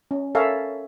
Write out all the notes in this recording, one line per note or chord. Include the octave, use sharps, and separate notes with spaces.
C#4
A4 A#4 C#5 E5 F5 G#5